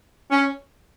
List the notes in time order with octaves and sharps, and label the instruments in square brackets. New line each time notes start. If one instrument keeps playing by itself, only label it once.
[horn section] C#4